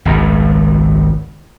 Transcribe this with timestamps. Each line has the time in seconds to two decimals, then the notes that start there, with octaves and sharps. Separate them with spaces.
0.05 G#1 C#2 F#2